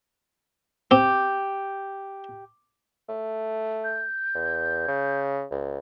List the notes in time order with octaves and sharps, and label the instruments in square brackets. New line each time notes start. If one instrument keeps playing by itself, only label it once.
[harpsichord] C4 [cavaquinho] G4
[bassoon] A3
[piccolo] G6
[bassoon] E2
C#3
C#2